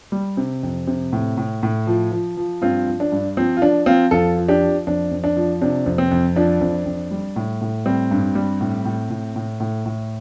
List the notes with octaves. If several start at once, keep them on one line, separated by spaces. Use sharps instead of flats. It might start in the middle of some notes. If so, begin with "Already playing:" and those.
G3
C3
F2
C3
A2
A2
A2
F3
F3
F3
G2 C4 F4
F3
D4
G2
F3 C4
F4
F3 D4
F3 C4 F4
F2 F4 A4
F3
D4 G4
F3
F2 D4
F2
D4
F3
C3 D4
F2
C4
F2
F3 D4
F2
F2
G3
A2
A2
G3 C4
G2
G3
A2
A2
A2
A2
A2
A2